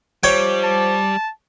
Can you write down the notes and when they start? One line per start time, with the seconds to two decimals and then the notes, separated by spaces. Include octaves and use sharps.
0.24 F3 G3 C#5 G5
0.63 A5